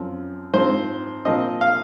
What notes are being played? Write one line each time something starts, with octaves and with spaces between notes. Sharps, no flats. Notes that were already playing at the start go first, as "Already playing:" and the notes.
Already playing: F#2 F3 C4
G#2 F3 C4 C5
A#2 F3 C4 D#5
F5